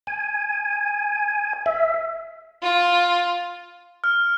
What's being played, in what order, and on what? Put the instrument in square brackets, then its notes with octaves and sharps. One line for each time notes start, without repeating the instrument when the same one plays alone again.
[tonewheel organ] G#5
E5
[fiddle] F4
[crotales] F6